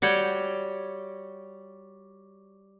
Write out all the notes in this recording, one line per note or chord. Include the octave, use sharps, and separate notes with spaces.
G3 F#4 C#5 G5